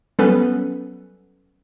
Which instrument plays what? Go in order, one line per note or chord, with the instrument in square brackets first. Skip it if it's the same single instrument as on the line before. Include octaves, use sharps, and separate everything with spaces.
[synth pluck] F#3 G3 B3 C#4 A4 B4